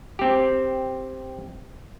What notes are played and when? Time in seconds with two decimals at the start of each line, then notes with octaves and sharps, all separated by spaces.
0.19 C4 G4